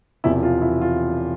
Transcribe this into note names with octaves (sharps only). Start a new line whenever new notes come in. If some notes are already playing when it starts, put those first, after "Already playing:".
E1 E2 C3 F3 E4
F4
E4
F4